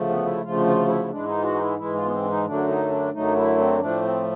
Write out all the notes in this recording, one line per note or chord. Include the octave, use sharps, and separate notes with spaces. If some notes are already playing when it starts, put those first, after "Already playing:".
Already playing: D2 C#3 F3 A3
B3
E4
D2 C#3 F3 A3 F4
F4
E4
G#2 E3 G#3 D4
D#4
F4
F#4
D#4
E4
G#2 E3 G#3 E4
F4
B3
C4
D4
D#4
F#2 D3 F#3 A3 D4
D#4
D4
F#2 D3 F#3 A3 D#4
E4
C4
A2 F3 A3 D4
C4